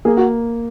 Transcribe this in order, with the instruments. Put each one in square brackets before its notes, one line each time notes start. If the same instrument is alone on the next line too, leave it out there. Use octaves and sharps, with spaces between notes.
[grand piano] A#3 [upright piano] G#4
[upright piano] F#4